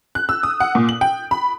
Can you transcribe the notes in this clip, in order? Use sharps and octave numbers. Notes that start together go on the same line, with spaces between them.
F#6
E6
D#6
F#5
A#2
F#7
G5
B5